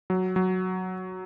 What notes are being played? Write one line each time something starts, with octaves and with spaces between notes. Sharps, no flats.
F#3
F#3